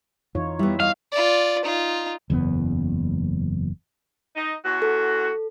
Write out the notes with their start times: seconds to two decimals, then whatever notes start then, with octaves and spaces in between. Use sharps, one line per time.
0.35 F2 E3 D#4 F4 C#5
0.59 G3 B3 E4 E5
0.80 D#5 F5
1.12 F4 D5
1.65 D#4 F4
2.30 F#1 E2 C#3 B3
4.36 D#4
4.65 E2 F#4
4.82 A4